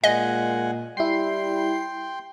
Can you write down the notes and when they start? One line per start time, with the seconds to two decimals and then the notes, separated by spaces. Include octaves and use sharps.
0.04 A#2 G#3 D#5 F#5 G#5
0.97 G3 E4 G5 C6 C7